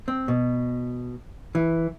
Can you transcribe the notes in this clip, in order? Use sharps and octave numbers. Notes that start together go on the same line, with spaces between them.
C4
B2
E3